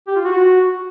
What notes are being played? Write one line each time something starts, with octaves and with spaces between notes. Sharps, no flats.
G4
F4
F#4